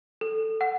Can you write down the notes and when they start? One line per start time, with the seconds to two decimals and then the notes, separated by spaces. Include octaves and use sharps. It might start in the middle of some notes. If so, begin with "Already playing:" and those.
0.21 A4
0.61 F#5